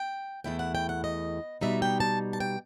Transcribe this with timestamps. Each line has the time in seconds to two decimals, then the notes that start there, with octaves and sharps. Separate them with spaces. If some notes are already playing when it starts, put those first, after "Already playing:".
Already playing: G5
0.44 E2 D#3 A3 E4 G5
0.59 F#5
0.75 G5
0.89 F#5
1.04 D#5
1.61 B2 G3 D#4 E5
1.82 G5
2.00 A5
2.33 A5
2.40 G5